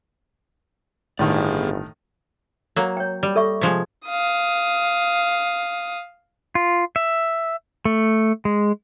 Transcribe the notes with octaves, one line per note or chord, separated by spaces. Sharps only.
G1 A2 D#3 G#4 D5
F#3 A#3
C#5 G5
G3
A4 E5 C#6
C3 F3 G#3
F5 D#6
F4
E5
A3
G#3